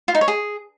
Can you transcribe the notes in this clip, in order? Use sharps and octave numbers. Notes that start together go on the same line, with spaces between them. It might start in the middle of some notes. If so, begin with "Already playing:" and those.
F4
D#4
C#5
G#4